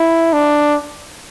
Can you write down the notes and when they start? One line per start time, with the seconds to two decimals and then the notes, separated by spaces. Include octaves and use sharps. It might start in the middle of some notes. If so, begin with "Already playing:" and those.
Already playing: E4
0.33 D4